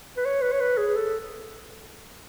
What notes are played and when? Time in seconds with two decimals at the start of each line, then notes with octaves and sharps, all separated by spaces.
0.17 B4
0.25 C#5
0.42 B4
0.52 C#5
0.60 B4
0.78 G#4
0.96 A4